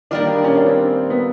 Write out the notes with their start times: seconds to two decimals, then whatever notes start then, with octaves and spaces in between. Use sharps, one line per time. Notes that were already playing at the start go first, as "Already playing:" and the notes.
0.11 D#3 G3 A#3 D4
0.44 C#4
0.55 D4
0.66 C4
1.10 B3